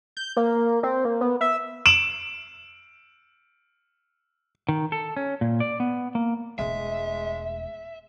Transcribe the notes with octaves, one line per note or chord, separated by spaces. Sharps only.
G6
A#3
C4
A#3
B3
E5
D7 E7 F#7
D#3
A4
C#4
A#2
D5
B3
A#3
E1 G#3 A3 E5